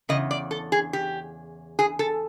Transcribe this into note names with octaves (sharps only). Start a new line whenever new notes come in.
E2 C#3 D#5
D5
A4
G#4
G4
G#4
A4